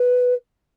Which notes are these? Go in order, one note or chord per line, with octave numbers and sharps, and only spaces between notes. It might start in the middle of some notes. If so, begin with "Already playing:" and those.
Already playing: B4